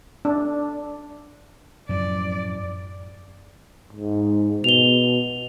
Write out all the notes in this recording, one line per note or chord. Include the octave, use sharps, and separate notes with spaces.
D4
F#2 A2 F3 D5
G#2
B2 F7 G7